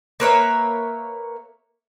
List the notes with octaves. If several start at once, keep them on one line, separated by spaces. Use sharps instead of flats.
A#3 B4 C#5 E5